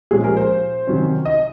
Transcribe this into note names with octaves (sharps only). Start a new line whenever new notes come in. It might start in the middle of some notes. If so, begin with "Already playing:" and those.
A#2 F3 G#3 C#4 G#4
A#4
C5
C3 D#3 F#3 C#4
D#5